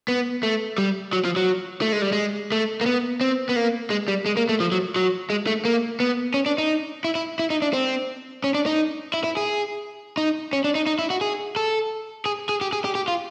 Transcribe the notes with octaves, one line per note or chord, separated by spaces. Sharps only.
B3
A3
G3
F#3
F3
F#3
A3
G#3
G3
G#3
A3
A#3
B3
C4
B3
A#3
G#3
G3
G#3
A#3
A3
F3
F#3
F#3
G#3
A3
A#3
B3
C#4
D4
D#4
E4
E4
E4
D#4
D4
C4
C#4
D4
D#4
E4
E4
G#4
D#4
C#4
D4
D#4
D#4
E4
F#4
G#4
A4
G#4
G#4
G4
G#4
G4
G4
F4